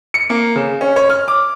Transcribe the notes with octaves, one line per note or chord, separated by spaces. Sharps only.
C#7
A#3
C#3
C#4
C#5
F6
D6